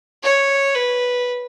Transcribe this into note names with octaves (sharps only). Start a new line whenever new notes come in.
C#5
B4